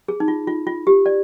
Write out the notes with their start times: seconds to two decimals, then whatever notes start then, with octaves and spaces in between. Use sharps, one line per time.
0.08 G#4
0.20 D#4
0.28 F4
0.47 F4
0.67 F4
0.87 G4
1.06 D5